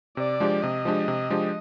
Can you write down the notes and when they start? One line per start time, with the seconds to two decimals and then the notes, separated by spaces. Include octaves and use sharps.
0.17 C3 D5
0.40 F3 G#3 D4 G4
0.63 C3 D#5
0.85 F3 G#3 D4 G4
1.08 C3
1.30 F3 G#3 D4 G4